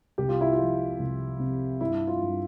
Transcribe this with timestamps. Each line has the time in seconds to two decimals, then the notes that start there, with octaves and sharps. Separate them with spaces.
0.18 C2 G4
0.29 F4
0.41 E4
0.53 F4
0.59 F3
0.99 C2
1.39 C3
1.81 G2 E4
2.07 F4
2.21 G2